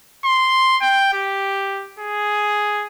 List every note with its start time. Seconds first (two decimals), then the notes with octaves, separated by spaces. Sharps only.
0.25 C6
0.82 G5
1.14 G4
1.99 G#4